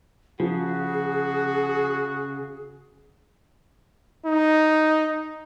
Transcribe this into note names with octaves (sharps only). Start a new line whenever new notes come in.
C#3 F3 F#4 G#4
D#4